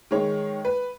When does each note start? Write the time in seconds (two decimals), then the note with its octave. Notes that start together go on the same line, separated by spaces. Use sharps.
0.11 D#3 G#3 C#5
0.65 B4